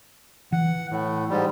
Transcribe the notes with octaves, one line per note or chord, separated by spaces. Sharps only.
E3 F#5
A2
G#2 G3